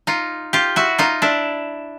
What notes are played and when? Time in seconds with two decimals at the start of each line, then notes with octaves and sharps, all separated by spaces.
0.07 D#4 F4
0.53 F4 G4
0.76 E4 F#4
0.98 D#4 F4
1.22 D4 E4